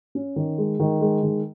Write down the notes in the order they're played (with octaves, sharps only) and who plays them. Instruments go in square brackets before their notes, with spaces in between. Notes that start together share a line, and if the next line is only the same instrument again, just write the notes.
[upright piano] C#4
D#3
G#3
D#3
G#3
D#3